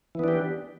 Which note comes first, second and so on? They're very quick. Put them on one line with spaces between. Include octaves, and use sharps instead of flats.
E3 B3 D4 G4